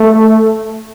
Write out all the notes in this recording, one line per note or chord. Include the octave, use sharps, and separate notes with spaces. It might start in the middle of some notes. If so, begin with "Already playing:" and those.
Already playing: A3